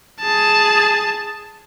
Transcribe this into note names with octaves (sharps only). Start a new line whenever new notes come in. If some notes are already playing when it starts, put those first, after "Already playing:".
G#4 A5